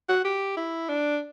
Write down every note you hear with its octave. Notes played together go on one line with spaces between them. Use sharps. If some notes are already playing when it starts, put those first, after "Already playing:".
F#4
G4
E4
D4